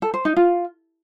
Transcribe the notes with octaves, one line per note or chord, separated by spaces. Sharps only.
A4
C5
D#4
F4